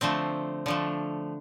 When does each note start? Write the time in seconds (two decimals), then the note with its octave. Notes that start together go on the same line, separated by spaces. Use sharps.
0.01 D3 F3 A3 C4
0.66 D3 F3 A3